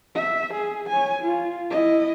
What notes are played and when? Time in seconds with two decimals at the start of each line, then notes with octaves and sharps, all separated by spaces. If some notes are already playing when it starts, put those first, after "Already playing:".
0.15 E5
0.54 G#4
0.89 C#5 G#5
1.21 F4
1.71 E4 D#5